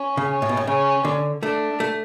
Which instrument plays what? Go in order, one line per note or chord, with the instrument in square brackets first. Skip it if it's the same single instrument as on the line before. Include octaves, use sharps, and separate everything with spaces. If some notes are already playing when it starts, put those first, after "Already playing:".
Already playing: [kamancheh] C#4
[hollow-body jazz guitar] C#3
[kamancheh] C#4
[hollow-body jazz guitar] A2
B2
A2
[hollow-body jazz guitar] C#3 [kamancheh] C#4
[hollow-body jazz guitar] D3
[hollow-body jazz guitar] A3 [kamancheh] D4
[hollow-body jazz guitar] A3